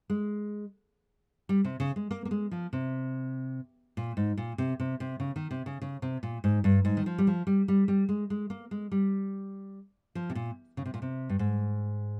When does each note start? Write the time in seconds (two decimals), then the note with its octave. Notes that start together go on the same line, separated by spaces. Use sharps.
0.10 G#3
1.49 G3
1.64 C3
1.80 C#3
1.96 G#3
2.11 A#3
2.25 A#3
2.31 G#3
2.51 F3
2.73 C3
3.97 A#2
4.17 G#2
4.37 A#2
4.58 C3
4.80 C3
5.00 C3
5.20 C#3
5.36 D#3
5.51 C3
5.66 C#3
5.82 C#3
6.02 C3
6.23 A#2
6.44 G#2
6.64 G2
6.85 G#2
6.97 D#3
7.06 F3
7.18 G3
7.27 F3
7.47 G3
7.68 G3
7.88 G3
8.09 G#3
8.30 G#3
8.50 A#3
8.71 G#3
8.92 G3
10.15 F3
10.30 C3
10.35 A#2
10.77 C#3
10.86 C3
10.94 A#2
11.02 C3
11.29 G2
11.39 G#2